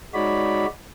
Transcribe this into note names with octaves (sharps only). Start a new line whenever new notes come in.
G#3 D#4 F#4 C#5 D5 B5